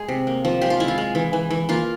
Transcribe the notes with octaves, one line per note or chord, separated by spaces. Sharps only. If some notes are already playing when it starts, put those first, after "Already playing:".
Already playing: G#3 G#4
C3
A#3
F3
G#3 G4
F4
G#3 E4
F4
G#3
E3
E3
E3
A#3 F4